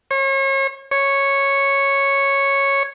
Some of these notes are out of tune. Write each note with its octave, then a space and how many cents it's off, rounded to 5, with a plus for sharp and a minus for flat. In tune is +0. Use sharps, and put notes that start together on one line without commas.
C#5 -35
C#5 -5